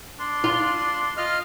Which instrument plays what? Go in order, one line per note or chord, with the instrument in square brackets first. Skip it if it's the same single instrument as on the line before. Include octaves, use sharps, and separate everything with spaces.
[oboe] D4 [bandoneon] C6
[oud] F4
[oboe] F4 [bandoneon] D#5 F6